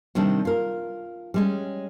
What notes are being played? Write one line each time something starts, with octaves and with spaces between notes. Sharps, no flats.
C3 D#3 G3 C4 D4
F4 A#4
G3 G#3 C#4